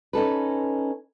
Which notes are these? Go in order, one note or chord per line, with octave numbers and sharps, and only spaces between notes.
C#4 D#4 A4 B4